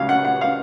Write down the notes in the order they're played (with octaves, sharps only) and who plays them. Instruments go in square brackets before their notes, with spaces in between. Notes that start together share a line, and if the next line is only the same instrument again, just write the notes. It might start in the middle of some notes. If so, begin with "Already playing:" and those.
Already playing: [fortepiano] C#2 C#3 F#3 C#4 F5
F#5
F#5
F5